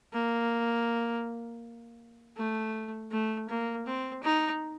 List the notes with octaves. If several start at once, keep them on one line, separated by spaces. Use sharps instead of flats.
A#3
A3
A3
A#3
C4
D#4